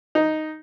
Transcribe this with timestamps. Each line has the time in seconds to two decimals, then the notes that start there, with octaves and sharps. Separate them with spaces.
0.15 D#4